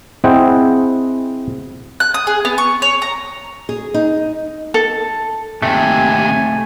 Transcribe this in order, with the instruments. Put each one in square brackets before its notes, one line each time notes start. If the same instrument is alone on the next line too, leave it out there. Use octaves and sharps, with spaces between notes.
[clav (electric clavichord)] C4 E4 G#4 D#5 F#5 G5
[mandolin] F#6
D#6
G#4
B3
C#6
C#5
A#5
[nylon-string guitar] G#4
D#4
[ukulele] A4
[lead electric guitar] D#2 C3 [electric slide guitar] A3 [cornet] G#5